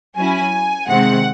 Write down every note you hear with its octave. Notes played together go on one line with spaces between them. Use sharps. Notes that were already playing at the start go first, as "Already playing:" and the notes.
F#3 C#4 E4 G#5
C3 D#3 G#3 C4 F#5